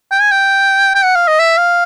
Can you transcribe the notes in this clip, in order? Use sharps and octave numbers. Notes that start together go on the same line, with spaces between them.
G5
G#5
G5
G5
F#5
F5
D#5
E5
F5